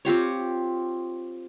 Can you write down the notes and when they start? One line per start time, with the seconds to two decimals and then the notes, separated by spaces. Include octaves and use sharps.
0.05 C4 F4 G4 C#5